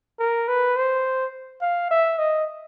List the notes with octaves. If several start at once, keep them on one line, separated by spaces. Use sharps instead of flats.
A#4
B4
C5
F5
E5
D#5